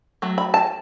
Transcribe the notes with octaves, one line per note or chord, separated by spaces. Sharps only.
F#3 A3
B5
A5